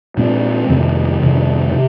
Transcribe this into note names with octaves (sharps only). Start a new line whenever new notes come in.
A#2 G#3 C4
F2 C3 D#3
F2 C3 D#3
C3